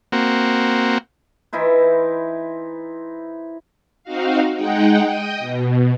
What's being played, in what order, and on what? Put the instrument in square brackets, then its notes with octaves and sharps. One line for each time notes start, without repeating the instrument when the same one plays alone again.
[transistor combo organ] A#3 C4 F#4
[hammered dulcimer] E3 D#4 E4 C5
[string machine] C4 D#4 F#4 F5
G#3 D#4 F#5 G5
D#5 G5 D#6
B2